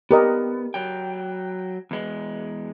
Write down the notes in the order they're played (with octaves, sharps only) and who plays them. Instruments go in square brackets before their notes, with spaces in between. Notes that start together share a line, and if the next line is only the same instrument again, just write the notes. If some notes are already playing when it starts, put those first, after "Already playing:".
[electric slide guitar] B3 [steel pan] G4 A#4 D#5
[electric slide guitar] F#3 G5
E2 G#3